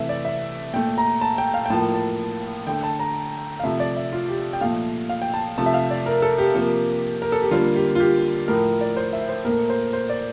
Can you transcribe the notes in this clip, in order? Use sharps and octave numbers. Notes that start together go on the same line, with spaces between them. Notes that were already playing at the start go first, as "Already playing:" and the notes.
Already playing: C3 E3 A3 E5
D5
E5
A#2 A3 G5
A#5
A5
G5
F5
G5
A2 F3 A#3 A5
A5
D3 A3 G5
A5
A#5
F5
C3 F3 A3 E5
D5
E5
F4
G4
G5
A#2 F3 A3 F5
F5
G5
A5
C3 F3 A3 A5
E5
F5
D5
A#4
A4
G4
C3 F3 A#3
A#4
A4
G4
D3 G3 A#3 F4
G4
F4
G4
A2 F3 A3 A#4
D5
C5
E5
C5
A#2 A3 A#4
C5
C5
D5